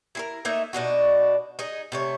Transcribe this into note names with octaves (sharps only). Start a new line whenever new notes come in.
E4 G#4 A#4
A3 A#3 D#4 E5
B2 D4 D#4 F#4
D#4 G#4
C3 A3 C#5